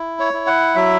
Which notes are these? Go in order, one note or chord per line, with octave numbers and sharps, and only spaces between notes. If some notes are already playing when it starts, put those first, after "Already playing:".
Already playing: E4
C#5
E4
F#5
F#3 E5